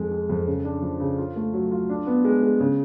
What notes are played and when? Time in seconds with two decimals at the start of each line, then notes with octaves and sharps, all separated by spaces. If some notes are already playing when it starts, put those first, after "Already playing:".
Already playing: F2 G#3
0.11 G#3
0.29 F2
0.47 C#3
0.65 D4
0.82 F3
1.00 C#3
1.18 F4
1.36 A3
1.53 F#3
1.71 F4
1.90 D4
2.07 B3
2.25 G#3
2.43 G#3
2.60 C#3